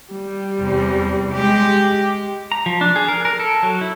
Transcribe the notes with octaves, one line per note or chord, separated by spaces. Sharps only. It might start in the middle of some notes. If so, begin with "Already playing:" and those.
G3
E2 C3
G#3 G4
A#5
F3
D4
G#4
A#4
A#4
A4
F#3
E4